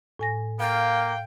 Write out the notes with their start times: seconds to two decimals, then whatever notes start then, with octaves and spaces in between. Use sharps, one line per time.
0.19 A2 G#5 A#6
0.60 A#3 F5 G5